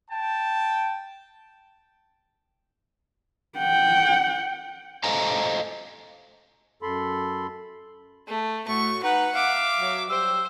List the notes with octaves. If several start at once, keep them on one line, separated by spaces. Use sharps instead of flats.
G5 A5
F#5 G5
A4 C5 D#5 F5 G#5 A#5
F#2 A4 B5 C6
A3
A2 A3 F#4 C#6
D#4 B4 F#5
E5 F5 D6
F#3
F#3 G3 G4 C5 E6